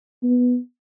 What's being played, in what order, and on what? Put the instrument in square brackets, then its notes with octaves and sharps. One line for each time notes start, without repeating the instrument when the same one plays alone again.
[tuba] B3